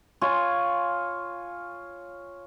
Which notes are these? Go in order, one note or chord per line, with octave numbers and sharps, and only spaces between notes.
F4 C#5 G#5